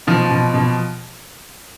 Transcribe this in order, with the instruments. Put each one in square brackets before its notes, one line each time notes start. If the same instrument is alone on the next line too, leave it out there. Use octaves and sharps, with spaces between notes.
[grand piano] B2 F3
B2
B2